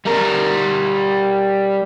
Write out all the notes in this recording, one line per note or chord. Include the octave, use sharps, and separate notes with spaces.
G3 A#4